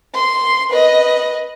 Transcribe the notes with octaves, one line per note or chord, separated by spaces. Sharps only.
C6
B4 D#5